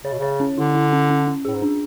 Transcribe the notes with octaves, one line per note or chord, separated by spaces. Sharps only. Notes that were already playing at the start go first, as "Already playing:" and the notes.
C#3 C#5
B2
C#3 C#5
C#4
D3 E4
E4
C#4
C#4
C#4
A2 G#4
G#2
D4